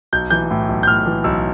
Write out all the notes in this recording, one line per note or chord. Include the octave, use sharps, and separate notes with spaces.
B1 G6
E3 G6
A2
B1
G6
A2 F6
E3
B1 E6